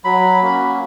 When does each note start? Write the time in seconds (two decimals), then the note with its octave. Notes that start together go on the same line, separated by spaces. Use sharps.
0.04 F#3 B5
0.42 A#3 C#4 F#4